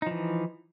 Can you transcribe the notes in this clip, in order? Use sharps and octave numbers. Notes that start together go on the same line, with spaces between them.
E3 F3 D#4